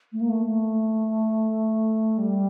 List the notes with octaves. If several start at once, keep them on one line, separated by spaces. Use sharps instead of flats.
A3
A#3
A3
A3
G3